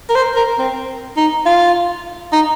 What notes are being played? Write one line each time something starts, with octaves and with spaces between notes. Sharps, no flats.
A#4
C5
A#4
C4
D#4
F4
D#4